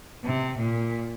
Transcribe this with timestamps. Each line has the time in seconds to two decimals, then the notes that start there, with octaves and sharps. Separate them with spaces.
0.25 C3
0.59 A#2